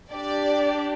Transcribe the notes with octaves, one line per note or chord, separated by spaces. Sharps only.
D4 G4 D5